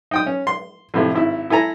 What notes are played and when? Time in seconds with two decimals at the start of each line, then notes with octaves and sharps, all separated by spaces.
0.11 D#4 G5 D#6
0.26 C#4
0.47 C6
0.94 F2 A2 C3
1.14 G#1 E4
1.50 E4 A4 G#5 A#5